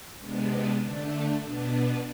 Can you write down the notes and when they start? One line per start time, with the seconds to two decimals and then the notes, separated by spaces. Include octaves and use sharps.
0.17 C3 G#3 B3 D4
0.79 D3 A3 D4
1.41 B2 B3 D4